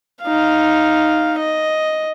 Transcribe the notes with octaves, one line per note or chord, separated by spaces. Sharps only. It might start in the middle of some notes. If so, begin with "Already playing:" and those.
D#4 F5
D#5